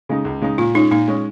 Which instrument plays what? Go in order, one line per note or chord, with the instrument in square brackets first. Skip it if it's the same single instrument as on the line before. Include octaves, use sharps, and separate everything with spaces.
[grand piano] C#3 G#3 D#4
C#2
C#3 G#3 D#4
[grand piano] A#2 [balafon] F4
[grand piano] G#3 C#4 [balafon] D#4
[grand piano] A#2 [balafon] D#4
[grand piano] G#3 C#4